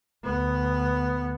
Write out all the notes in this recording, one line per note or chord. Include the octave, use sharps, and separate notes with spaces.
D2 B3